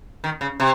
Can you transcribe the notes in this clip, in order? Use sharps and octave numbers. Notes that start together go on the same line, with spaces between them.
D#3
C#3
C3